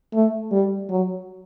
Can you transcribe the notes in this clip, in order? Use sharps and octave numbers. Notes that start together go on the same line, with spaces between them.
A3
G3
F#3